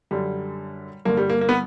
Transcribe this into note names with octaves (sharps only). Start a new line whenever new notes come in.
F#2 D3 G3
G2 D3 A#3
G3
A#3
A#3
B3